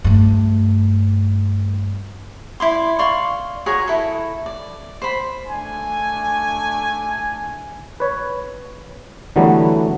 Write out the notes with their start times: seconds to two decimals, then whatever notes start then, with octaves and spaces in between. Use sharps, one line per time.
0.04 G2 A3
2.60 E4 D5 C6
2.99 D5 F5 C6 C#6
3.66 F#4 G#4 A#4 C#5
3.88 E4 A4
4.46 D5
5.02 C5 B5
5.47 A3 D4 G#5
8.00 B4 C#5
9.36 D3 E3 F#3 G3 A3 B3